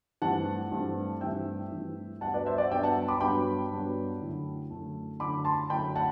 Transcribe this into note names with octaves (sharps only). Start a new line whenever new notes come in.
G2 E3 A3 C4 F#5 A5
G2 E3 A3 C4
G2 E3 A3 C4 E5 G5
G2 E3 A3 C4
G2 F#3 B3 D4 F#5 A5
B4 D5
C5 E5
D5 F#5
G2 F#3 B3 D4 E5 G5
F#5 A5
B5 D6
G2 F#3 B3 D4 G5 B5
G2 F#3 B3 D4
F#2 D3 A3 E4
F#2 D3 A3 E4
F#2 D3 A3 E4 B5 D6
A5 C6
F#2 D3 A3 E4 G5 B5
F#5 A5